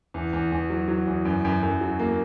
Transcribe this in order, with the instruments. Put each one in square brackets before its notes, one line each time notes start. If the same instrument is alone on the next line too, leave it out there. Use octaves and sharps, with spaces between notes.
[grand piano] E2
E2
E2
F#3
F#3
E2
F#2
F#2
F#2
F#3
A#3